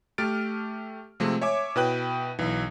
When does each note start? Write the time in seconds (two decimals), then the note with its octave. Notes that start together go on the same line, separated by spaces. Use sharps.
0.18 A3 G4 F6 A6 D7
1.20 C3 F3 G#3 A3 C4
1.41 C#5 E5 G#5 D6
1.76 B2 E4 B4 G5 F#6
2.39 B1 E3